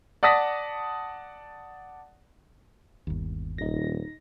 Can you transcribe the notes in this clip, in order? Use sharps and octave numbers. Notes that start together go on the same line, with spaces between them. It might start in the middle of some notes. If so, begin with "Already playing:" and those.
D5 F#5 A5 D#6 A#6 B6
G1 D#2
D#1 D#4 A#6